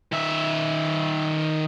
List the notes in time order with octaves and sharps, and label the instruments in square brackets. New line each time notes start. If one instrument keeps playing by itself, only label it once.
[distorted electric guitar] D#3 E5